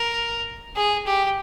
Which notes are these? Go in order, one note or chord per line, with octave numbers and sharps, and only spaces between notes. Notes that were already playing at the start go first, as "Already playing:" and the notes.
Already playing: A#4
G#4
G4